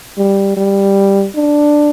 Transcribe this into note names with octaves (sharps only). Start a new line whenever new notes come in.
G3
G3
D4